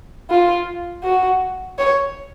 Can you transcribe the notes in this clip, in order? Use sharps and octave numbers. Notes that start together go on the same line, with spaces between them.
F4
F#4
C#5